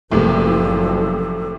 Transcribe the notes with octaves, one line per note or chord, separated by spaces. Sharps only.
F#1 C2 A2 C3 F3 A4